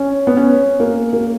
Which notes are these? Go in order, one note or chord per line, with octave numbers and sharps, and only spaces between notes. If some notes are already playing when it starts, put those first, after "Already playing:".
Already playing: C#4
B3
C#4
A#3
A#3